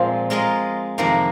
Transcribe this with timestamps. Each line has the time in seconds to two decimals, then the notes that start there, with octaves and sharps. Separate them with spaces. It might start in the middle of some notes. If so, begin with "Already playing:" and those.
Already playing: A#2 F3 G#3 C4 F4
0.30 G#3 F4 A#4 D#5
0.98 F2 C3 D#3 A#3